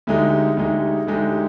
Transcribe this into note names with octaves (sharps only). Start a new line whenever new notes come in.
D2 D3 G#3 D#4 G4
D2 D3 G#3 D#4 G4
D2 D3 G#3 D#4 G4